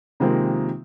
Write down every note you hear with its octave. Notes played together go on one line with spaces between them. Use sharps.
C3 D#3 F3 G#3 A#3 C4